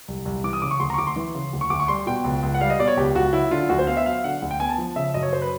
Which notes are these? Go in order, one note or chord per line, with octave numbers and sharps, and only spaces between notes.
C2
C2
E3 D6
D#6
C#3 D6
C#6
D2 C6
A#5
C#6
D2 D6
C6
E3
C#3
D2
C#6
D2 D6
C#6
G3 C6
B2 G5
C#2
C#2
F#5
G3 F5
D#5
B2 D5
C#5
C#2 G4
C#2 F#4
F#3 E4
D3 F4
D2 F#4
C5
B3 F5
E5
F#3 F5
D3 F#5
D2
G5
B3 G#5
A5
F3
C#3 E5
F#2 D#5
C#5
F#2 C5
B4